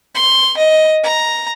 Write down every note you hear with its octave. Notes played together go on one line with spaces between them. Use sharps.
C6
D#5
A#5